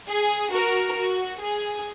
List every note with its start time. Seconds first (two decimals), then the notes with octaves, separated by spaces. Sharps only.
0.09 G#4
0.52 F#4 A#4
0.97 F#4
1.41 G#4